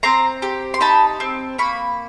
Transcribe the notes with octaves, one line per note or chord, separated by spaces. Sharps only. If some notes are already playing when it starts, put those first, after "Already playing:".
C4 A#5 C6
G4
C6
D#4 A5 B5
C4
A#3 B5 C#6